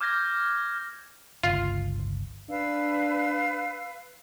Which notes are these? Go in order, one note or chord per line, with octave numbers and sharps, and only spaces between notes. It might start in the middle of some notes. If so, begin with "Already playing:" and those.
D6 F6 G6 G#6 A#6
G1 C#2 F4
D4 B4 F5 E6